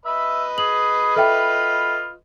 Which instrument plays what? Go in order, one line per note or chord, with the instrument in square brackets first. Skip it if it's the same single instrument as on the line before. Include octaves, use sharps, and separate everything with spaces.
[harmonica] B4 D#5 B5 [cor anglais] E5
[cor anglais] G#4 [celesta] F#7
[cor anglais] F4 [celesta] A4 E5 G5